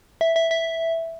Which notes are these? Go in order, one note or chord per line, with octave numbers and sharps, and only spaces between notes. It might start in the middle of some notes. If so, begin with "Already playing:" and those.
E5
E5
E5